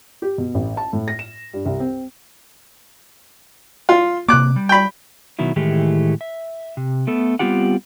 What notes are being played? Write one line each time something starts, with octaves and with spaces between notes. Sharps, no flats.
G4
B2
A1
A5
A2
A#6
E7
G2
C2
C4
F4
C3 A#3 D6 F#6
G3
G5 B5
B2 D#3 F#3 E4
A2 D#3 E3 G#3 A3 G4
E5
C3
A3 B3 A4
G3 B3 C4 F4 G4 F#5